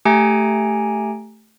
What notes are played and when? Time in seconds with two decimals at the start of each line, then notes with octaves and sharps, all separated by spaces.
0.05 A3 G4 G#5 A#5 D7